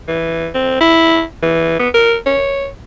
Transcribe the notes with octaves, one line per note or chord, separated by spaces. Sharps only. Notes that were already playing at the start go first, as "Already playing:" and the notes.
E3
C4
E4
E3
B3
A#4
C#5